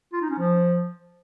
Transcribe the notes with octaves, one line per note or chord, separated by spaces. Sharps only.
F4
D#4
C#4
F3